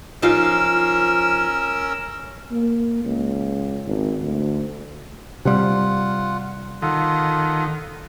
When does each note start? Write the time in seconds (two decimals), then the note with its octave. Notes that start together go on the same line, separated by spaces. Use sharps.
0.22 F3 C#4 D#4 F4 A#4 E6
2.51 A#3
3.05 C#2
3.87 G#1
4.22 D2
5.45 C3 G3 F4 F#5
6.82 D#3 F4 A4 F#5